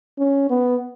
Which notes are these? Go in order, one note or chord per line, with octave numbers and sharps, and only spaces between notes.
C#4
B3